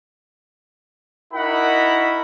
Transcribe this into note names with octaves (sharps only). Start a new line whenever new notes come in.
D#4 E4 F#4 A#4 F#5 B5